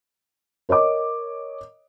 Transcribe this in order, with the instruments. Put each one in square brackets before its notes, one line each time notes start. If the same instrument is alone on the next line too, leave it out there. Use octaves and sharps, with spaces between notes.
[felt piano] A#4 C#5 D#5 D6